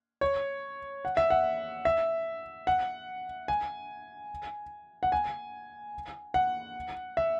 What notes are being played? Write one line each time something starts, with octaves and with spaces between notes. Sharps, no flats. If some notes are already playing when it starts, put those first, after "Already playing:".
C#5
F#5
E5
F#5
E5
F#5
G#5
F#5
G#5
F#5
E5